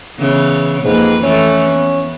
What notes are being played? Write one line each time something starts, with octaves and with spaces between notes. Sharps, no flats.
C#3 E3 B3
F2 G#2 A#3 B4
E3 A3 C#4
B3